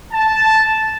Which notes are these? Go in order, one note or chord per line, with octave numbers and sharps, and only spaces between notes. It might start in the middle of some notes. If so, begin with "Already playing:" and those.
A5